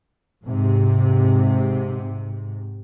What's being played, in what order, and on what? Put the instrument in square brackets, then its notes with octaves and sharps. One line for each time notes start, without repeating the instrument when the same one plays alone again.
[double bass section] G#2 C3